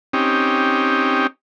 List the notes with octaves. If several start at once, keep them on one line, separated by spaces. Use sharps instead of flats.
C4 C#4 D#4 G4